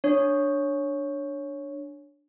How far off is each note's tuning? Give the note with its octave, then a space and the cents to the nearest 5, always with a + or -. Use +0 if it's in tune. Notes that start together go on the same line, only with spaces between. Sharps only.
D4 +0 C#5 +0